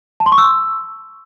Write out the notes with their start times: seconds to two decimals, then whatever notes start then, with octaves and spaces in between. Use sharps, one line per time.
0.20 A5
0.26 C6
0.32 C#6
0.38 E6